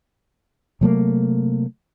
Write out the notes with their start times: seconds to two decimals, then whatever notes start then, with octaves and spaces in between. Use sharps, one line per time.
0.81 C3 F#3 A3 A#3